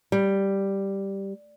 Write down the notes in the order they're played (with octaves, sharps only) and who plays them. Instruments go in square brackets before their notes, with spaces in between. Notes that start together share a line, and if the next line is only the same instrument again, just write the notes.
[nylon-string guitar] G3